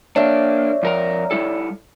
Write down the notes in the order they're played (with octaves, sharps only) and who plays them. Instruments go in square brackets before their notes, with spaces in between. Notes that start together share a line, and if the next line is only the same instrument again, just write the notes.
[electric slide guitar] A#3 D4 [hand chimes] C#5 D5 E5
[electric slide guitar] F2 A#4 A#5
G3 E4 A4